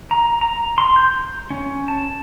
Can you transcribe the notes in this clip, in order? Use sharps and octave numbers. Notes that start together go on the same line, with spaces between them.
A#5
A#5
C6
G6
C#4
A5